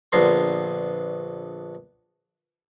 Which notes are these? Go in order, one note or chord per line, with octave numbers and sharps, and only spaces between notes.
A#1 D3 B3 A#4 C6